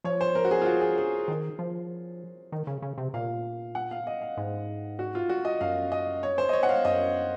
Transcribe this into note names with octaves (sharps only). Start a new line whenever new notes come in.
F3 C#5
C5
A#4
F#4
G#4
F4
F#4
G#4
G#4
D#3
F3
D#3
C#3
C#3
C3
A#2 F5
F#5
F5
D#5
F5
G#2
F#4
F4
F#4
D#5
F#2 F5
D#5
C#5
C5
D#5
C#5
F#5
F5
F#2 D#5